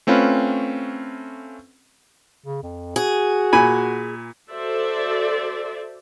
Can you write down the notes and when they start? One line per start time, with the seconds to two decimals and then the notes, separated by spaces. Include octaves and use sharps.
0.07 A3 C4 C#4 F4 B4
2.46 C#3
2.63 F2
2.96 F#4 G#4
3.53 A#2 G#5 B5
4.50 F#4 A4 C5 D5 E5